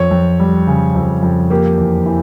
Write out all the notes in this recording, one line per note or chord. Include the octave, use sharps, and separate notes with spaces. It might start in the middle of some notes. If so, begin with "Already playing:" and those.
Already playing: F2 C#5
F2
G3
C#3
F2
F2
A#3 G4
E2
E3